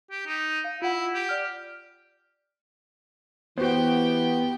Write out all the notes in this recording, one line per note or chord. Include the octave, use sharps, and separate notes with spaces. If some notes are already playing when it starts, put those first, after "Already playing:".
G4
D#4
F5
E4 F4 F#5
G4
D5 F6
E3 B3 F#4 G4 C5 G5